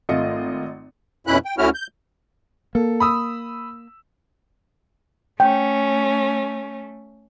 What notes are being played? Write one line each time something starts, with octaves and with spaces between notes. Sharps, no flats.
G#1 A3 F4 D#5 C#7
F2 B2 C#4 E4 B5 F#6
G5
D2 A3 C#4 E4 F#4 F6
G6
A#3 A4
B5 D#6 E6
A3 C#4 G5